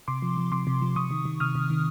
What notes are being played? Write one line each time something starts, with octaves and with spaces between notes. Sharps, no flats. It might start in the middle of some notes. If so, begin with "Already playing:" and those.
C3 C6 D6
F3
F3
C3 C6 D6
C3
F3
C3 C#6 D#6
D#3
D#3
C3 D#6 F6
C3
D#3